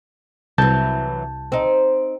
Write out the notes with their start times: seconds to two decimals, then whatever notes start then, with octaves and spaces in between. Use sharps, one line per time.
0.58 C2 E3 F#3 A5 G6
1.52 C4 D#4